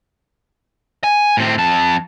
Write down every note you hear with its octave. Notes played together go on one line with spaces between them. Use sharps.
G#5
A2 C4
F2 A5